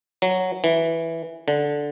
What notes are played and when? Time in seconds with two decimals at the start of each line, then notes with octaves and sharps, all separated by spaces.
0.22 F#3
0.64 E3
1.48 D3